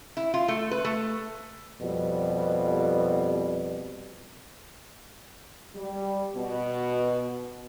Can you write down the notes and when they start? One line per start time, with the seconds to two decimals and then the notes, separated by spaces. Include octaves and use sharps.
0.17 E4
0.34 F4
0.48 A3
0.71 B4
0.85 A3
1.81 F2 B2 G3
5.75 G3
6.36 B2